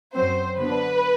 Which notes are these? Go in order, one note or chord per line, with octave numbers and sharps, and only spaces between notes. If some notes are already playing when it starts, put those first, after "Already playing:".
F#2 F#3 C4 C5
D3 F#3 B3 D4 B4